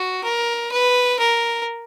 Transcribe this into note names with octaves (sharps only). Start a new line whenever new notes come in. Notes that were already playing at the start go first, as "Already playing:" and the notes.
Already playing: F#4
A#4
B4
A#4